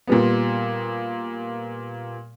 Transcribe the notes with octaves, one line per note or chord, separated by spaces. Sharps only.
A#2 G3 B3